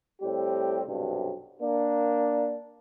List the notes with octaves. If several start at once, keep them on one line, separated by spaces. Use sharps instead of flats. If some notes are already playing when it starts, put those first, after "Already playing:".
A2 G3 C4 G4
B1 G2 C3
A#3 D4